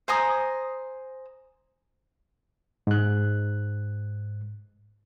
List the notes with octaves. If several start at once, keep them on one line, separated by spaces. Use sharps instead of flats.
C5 G#5 A#5 D#6
G#2 F#6